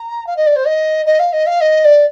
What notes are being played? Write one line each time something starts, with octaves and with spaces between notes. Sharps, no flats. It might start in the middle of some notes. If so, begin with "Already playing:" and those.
Already playing: A#5
F5
D#5
D5
C5
D#5
D#5
F5
D#5
F5
D#5
D5